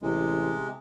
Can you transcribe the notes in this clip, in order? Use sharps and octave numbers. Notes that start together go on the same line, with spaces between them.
A1 C3 G#3